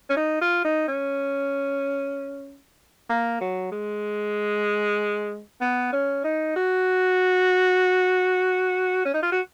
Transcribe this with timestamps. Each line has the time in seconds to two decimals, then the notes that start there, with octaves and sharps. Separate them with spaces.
0.10 C#4
0.17 D#4
0.41 F4
0.64 D#4
0.88 C#4
3.10 A#3
3.41 F#3
3.72 G#3
5.61 B3
5.93 C#4
6.24 D#4
6.56 F#4
9.05 C#4
9.14 D#4
9.23 F4
9.32 F#4